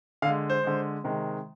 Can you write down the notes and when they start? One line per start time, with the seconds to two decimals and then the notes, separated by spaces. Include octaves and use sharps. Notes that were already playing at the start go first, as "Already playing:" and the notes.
0.22 D3 F5
0.27 G#3
0.50 C5
0.63 D3 G#3
1.04 C3 D#3 G#3